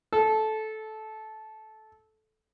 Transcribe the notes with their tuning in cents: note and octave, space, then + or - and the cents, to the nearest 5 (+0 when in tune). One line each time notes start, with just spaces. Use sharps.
A4 -15